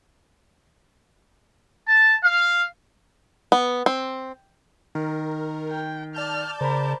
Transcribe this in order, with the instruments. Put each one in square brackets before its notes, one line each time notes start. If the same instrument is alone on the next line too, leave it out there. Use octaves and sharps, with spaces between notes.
[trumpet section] A5
F5
[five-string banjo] B3
C4
[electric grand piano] D#3 [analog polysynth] A#4
[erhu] G5
[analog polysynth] D5 A5 G6 [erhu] F6
[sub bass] C#3 [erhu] A#4 [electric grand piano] C5 B5